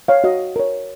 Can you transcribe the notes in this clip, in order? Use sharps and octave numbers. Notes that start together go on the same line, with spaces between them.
C#5 F5
F#4 D#5
A#4 C#5